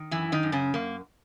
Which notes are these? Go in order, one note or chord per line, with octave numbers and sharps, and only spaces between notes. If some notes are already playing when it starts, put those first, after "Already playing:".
Already playing: D#3
F#2 E3 E4
D#3 D#4
F#2
C#3 C#4
F#2 A#3